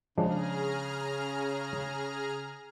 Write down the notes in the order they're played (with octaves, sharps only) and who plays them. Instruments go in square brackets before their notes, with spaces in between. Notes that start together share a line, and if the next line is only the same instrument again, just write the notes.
[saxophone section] C#3 [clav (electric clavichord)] F3 G#3 D4 [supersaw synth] G#4 A#5 F6